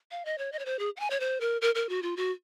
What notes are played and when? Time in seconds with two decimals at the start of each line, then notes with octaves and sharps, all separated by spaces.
0.11 F5
0.25 D#5
0.38 C#5
0.52 D#5
0.59 C#5
0.65 C5
0.79 G#4
0.97 F#5
1.00 G#5
1.10 C#5
1.20 C5
1.41 A#4
1.61 A#4
1.75 A#4
1.89 F#4
2.03 F4
2.17 F#4